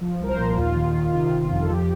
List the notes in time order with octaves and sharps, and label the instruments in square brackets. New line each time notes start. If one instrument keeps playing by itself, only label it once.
[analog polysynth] F3
C2 A#4
C5
A#2
D#2 F4
D#3
D#3
C3 F4
G1
F2
A4
F3 G4